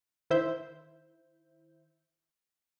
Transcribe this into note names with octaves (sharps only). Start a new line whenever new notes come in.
D#3 E4 C5 E5 G6